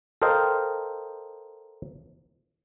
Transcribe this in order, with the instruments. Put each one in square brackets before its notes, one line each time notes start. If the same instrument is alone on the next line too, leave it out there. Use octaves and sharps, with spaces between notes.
[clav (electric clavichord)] A4 A#4 C5 D#5 F5 G5